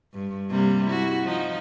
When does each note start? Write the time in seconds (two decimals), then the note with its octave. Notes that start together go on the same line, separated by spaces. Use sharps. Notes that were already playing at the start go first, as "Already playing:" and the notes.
0.13 G2
0.51 C3 G3 A#3
0.87 E4 F#4
1.23 F3 D#4